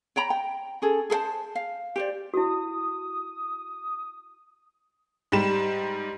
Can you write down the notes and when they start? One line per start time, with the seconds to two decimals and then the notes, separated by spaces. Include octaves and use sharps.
0.16 C#5 G5 A#5 B5
0.30 G5
0.82 C#4 G#4 A4
1.10 G#4 A4 C5 A5
1.55 F5
1.96 G4 C5 D5
2.34 E4 F#4 D#6
5.32 G#2 G3 G4 E7